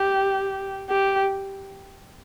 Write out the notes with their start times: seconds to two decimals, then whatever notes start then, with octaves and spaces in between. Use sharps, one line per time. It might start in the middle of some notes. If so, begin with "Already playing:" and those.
Already playing: G4
0.90 G4